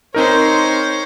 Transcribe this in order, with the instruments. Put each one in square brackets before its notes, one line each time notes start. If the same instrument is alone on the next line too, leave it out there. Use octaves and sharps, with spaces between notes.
[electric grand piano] C4 D#4 A#4 [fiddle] C5 C#5